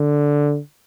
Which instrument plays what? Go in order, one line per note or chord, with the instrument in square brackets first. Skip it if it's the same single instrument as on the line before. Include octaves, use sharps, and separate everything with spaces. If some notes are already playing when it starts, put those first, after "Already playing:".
Already playing: [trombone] D3